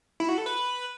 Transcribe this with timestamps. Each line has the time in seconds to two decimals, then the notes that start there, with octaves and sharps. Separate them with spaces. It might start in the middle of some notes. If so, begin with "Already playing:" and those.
0.20 E4
0.29 F#4
0.38 A4
0.46 B4